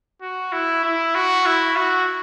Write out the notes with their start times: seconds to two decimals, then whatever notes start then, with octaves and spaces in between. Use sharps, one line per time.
0.22 F#4
0.52 E4
0.84 E4
1.15 F#4
1.46 E4
1.76 F#4